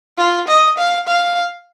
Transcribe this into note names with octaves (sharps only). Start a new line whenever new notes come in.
F4
D#5
F5
F5